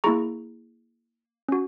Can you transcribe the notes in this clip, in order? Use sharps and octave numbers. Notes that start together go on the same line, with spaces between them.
A#3 E4 G#4 A#5 C#6
C#4 F#4